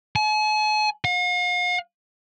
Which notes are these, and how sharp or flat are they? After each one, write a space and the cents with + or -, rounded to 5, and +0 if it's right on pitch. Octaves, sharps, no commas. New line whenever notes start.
G#5 +45
F5 +45